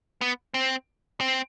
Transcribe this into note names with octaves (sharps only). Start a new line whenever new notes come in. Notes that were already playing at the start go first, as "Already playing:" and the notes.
B3
C4
C4